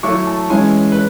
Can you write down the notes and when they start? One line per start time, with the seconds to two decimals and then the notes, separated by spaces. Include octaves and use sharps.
0.03 F#3 A3 E4 C#6
0.27 A5
0.50 E3 G#3 C#4 E4 G#5
0.92 B4